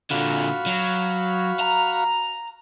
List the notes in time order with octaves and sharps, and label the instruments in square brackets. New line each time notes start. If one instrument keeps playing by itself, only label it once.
[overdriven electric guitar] A#2 D3 [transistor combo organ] F#4 F5 B5
[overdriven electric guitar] F#3
A#5